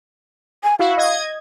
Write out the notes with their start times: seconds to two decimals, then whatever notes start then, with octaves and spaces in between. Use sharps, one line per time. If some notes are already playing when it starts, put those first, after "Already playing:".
0.64 G#5
0.79 E4 F#4 F5
0.97 D#5 G#6